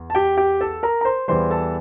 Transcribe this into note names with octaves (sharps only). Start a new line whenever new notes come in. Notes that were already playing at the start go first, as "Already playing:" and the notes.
Already playing: E2
A5
G4 G5
G4 G5
A4 A5
A#4 A#5
A#5
C5 C6
E2 E3 G3 C5 C6
A4 A5